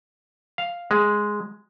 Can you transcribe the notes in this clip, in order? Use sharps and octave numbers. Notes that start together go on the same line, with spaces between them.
F5
G#3